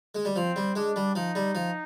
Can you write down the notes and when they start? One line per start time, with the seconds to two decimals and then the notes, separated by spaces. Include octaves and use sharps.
0.15 G#3
0.25 G3
0.35 F3 C4
0.56 G3
0.76 G#3 D4
0.96 G3
1.15 F3 D#4
1.35 G3
1.55 F3